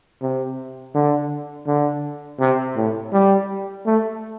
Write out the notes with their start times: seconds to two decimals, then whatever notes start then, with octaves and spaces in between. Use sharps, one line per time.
0.22 C3
0.94 D3
1.67 D3
2.40 C3
2.76 A2
3.13 G3
3.86 A3